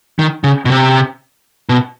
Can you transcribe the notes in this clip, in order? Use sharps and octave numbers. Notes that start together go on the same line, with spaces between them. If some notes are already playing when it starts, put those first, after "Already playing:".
D#3
C#3
B2
C3
B2